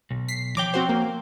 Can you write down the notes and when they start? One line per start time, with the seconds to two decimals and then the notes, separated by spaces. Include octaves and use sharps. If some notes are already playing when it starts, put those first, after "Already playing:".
0.11 B1
0.28 B6 C7
0.57 F3 C#5 G5 D6
0.74 C4 F#4 C5
0.89 A#3